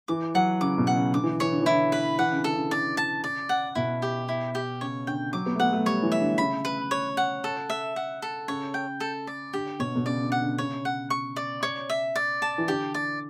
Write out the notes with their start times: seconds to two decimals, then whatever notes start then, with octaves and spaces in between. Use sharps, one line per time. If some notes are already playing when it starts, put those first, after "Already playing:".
0.08 E3 D6
0.35 F#3 F#5
0.61 C#3 D6
0.78 B2
0.87 F#5
0.96 C#3
1.14 D3 D6
1.24 E3
1.33 D3
1.40 E3 C#5
1.52 D3
1.61 E3
1.66 D3 E4
1.92 B4
2.18 E3 F#5
2.31 C#3
2.36 D3
2.44 A4
2.53 C#3
2.71 D5
2.97 A5
3.24 D5
3.49 F#5
3.75 B2 E4
4.02 G4
4.29 E4
4.55 G4
4.81 C#3 C#5
5.07 D3 G5
5.33 F#3 D6
5.46 B3
5.56 A3
5.60 B3 F#5
5.73 A3
5.86 G3 C#5
6.03 E3
6.12 E5
6.21 D3
6.38 C#3 B5
6.65 B4
6.91 C#5
7.17 F#5
7.44 A4
7.70 E5
7.96 F#5
8.22 A4
8.48 C#3 C#5
8.74 G5
9.00 A4
9.27 D5
9.53 D3 G4
9.80 B2 C#5
9.96 B2
10.06 C#3 D5
10.23 D3
10.32 F#5
10.41 D3
10.58 C#3 C#5
10.85 F#5
11.10 C#6
11.36 D5
11.63 C#5
11.90 E5
12.16 D5
12.42 A5
12.58 E3
12.68 D3 G4
12.94 D5